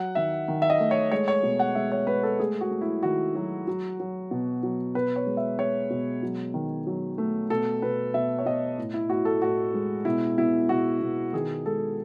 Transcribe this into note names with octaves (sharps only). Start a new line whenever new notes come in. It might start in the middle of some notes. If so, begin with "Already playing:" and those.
Already playing: F#3 F#5
D#3 E5
D#3
E5
D#5
A3
C#5
G#3 C#5
C#5
B2
F#5
G#3 E5
C#5
G#3 B4
A4
A3 G#4
F#4
A3
E4
D#3 F#4
F#3
F#3
F#3
B2
F#3
B2 B4
C#5
G#3
E5
G#3 C#5
B2
F#3
D#3
F#3
A3
B2 A4
B2 B4
B2 E5
C#5
B2 D#5
A2
E4
A2 F#4
A4
A2 F#4
G#3
B2 E4
B2 E4
B2 F#4
B2
D#3 G#4
G#3 A4